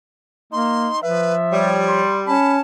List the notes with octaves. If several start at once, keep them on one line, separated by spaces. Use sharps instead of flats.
A#3 D#4 C6
F3 B4 E5
G3 C#5
C6
C#4 A5 B5